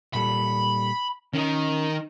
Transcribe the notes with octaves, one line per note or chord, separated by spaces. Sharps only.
A#2 G3 A4 B5
D#3 C#4 D#4